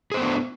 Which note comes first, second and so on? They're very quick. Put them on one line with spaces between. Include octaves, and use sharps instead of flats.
G#4 C5 B3 A3 D4